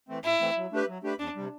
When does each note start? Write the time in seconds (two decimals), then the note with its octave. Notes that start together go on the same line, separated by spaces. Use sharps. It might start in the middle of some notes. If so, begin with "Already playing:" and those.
0.09 E3 A3 C4
0.24 A2 E4
0.40 E3 A3 C4
0.56 F#3
0.72 A3 D4 G4 B4
0.88 F#3
1.03 A3 D4 G4 B4
1.19 E2 D4
1.36 C3 G3